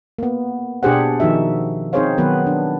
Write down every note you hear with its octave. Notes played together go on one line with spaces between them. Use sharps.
A#3 B3
B2 D4 G4 G#4 C5 F#5
D#3 F3 D#4 F#4 E5
C4 D#4 G#4 C5 C#5 F5
D#3 F#3 B3 B4
D4